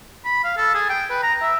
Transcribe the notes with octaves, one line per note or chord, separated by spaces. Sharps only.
B5
F5
A4
G#4
G5
B4
A#5
E5